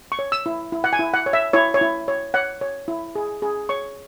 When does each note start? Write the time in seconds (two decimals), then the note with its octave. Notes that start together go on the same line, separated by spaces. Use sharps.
0.12 C#6
0.19 C#5
0.32 E6
0.46 E4
0.72 E4
0.84 F#5
0.93 G#5
0.99 E4
1.14 F#5
1.26 C#5
1.33 E5
1.53 E4 C#5
1.74 C#5
1.81 E4
2.08 C#5
2.34 C#5 F#5
2.61 C#5
2.88 E4
3.15 G#4
3.42 G#4
3.69 C#5 C#6